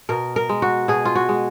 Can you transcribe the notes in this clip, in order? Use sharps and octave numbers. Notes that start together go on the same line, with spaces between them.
B2 A#4
A#4
G#3
F#4
B2 G#4
F4
F#4
G#3